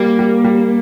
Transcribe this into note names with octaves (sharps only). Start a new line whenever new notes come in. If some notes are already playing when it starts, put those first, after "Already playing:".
Already playing: G3 A#3
G3
G3